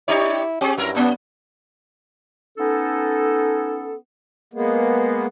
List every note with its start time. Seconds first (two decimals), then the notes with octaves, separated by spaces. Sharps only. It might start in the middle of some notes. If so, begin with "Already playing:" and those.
0.08 D4 E4 G4 C#5
0.61 C4 G4 G#4
0.77 G2 F#3 E4 A#4
0.96 B3 C#4
2.58 B3 C#4 D#4 A4
4.54 G#3 A#3 B3